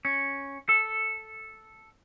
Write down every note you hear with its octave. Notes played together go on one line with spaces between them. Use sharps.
C#4
A4